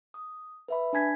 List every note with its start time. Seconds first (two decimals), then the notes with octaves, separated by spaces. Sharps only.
0.14 D#6
0.68 B4 E5 B5
0.93 D4 G#5 A5 G#6 B6